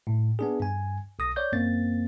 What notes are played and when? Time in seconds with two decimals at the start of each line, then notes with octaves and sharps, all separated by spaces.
0.07 A2
0.39 B3 D4 G#4
0.60 G2 G#5
1.19 B1 D#6 A#6
1.36 C#5 D5 G6
1.52 F#2 A#3 C4 A6